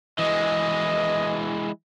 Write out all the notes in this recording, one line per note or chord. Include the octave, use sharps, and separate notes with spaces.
E3 G#3 D#5